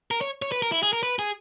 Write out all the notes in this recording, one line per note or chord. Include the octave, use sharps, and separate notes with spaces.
A#4
C#5
C#5
B4
A#4
E4
G#4
A#4
B4
G#4